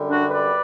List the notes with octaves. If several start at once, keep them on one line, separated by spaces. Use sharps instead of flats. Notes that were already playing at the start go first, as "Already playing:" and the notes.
Already playing: F#2 D3 G3
D4 F#4
B4 D5